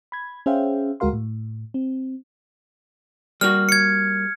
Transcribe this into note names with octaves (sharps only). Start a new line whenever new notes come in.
B5 G#6
C#4 G#4 C5 E5 F5 G5
D2 G#3 F#4 A#4 F5 C6
A2
C4
G3 A#3 F#4 F6
G#6 C#7